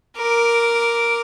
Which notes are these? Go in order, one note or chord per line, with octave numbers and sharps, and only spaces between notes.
A#4 D6